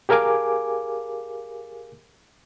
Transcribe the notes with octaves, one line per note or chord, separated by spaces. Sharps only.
G4 G#4 A#4 F5 G#5 D6